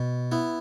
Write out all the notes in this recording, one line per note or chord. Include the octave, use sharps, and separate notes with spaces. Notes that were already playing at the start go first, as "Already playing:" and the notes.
Already playing: B2
B3 E4